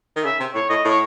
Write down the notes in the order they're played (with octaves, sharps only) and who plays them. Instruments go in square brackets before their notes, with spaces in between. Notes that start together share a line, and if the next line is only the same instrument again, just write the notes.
[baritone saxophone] D#3
[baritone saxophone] C#3 [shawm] E5
[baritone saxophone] C3
[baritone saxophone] A2 [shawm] C#5
[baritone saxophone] A2 [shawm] D#5
[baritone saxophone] A2
[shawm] C#5